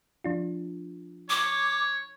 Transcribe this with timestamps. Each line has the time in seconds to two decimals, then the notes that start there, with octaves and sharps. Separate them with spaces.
0.24 F3 D4 F4
1.30 C#5 D6